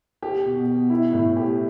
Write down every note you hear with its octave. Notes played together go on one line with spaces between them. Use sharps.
G4
B2
B2
E4
A2
G4